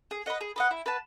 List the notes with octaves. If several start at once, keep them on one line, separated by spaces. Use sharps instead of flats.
G#4
B4 D#5 F#5
G#4
B4 D#5 F#5
E4
B4 F#5 A5